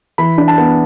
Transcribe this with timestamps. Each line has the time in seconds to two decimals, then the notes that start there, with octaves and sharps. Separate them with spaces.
0.18 E3 B5
0.38 D4
0.48 A5
0.58 B3